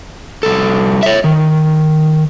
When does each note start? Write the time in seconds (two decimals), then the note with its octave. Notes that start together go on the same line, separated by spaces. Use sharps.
0.43 C2 A4
1.03 C#5 E5
1.24 D#3